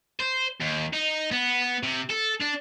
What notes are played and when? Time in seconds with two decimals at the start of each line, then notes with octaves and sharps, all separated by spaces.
0.20 C5
0.60 D#2
0.93 D#4
1.31 B3
1.83 C3
2.10 A4
2.41 D4